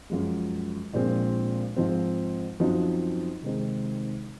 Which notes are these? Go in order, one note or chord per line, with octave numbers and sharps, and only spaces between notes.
F#2 F3 G#3
A#1 A#2 G#3 C4 F4
G#2 F3 C4
F#2 F3 C4 D#4 F#4
C3 D#3 G#3 C4 D#4